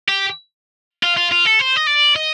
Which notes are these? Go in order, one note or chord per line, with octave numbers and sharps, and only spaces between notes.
G4
F4
F4
F4
A4
C5
D#5
D5
D#5